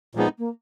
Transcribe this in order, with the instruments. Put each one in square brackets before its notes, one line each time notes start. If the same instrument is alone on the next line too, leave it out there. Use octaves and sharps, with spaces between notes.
[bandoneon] A#2 F3 B3 D#4 [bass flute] G#3
[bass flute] A#3